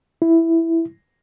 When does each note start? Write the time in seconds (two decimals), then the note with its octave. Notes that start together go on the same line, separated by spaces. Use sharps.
0.22 E4